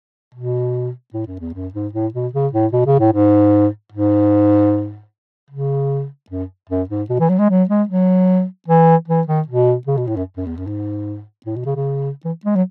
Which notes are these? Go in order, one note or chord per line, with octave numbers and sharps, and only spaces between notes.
B2
A2
F#2
E2
F#2
G#2
A2
B2
C#3
A2
B2
C#3
A2
G#2
G#2
C#3
F#2
F#2
G#2
B2
E3
F#3
G#3
F#3
G#3
F#3
E3
E3
D#3
B2
C#3
B2
A2
F#2
F#2
E2
F#2
G#2
A2
B2
C#3
C#3
E3
G#3
F#3